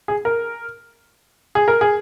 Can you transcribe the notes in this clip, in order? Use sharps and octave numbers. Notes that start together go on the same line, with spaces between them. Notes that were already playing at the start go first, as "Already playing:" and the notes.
G#4
A#4
G#4
A#4
G#4